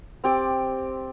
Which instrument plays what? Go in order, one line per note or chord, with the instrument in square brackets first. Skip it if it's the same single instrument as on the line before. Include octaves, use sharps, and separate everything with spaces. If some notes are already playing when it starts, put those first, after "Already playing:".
[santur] C4 G4 D5